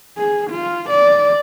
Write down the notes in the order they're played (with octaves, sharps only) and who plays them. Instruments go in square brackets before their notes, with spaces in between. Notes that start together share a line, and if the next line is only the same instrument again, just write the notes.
[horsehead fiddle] G#4
F4
D5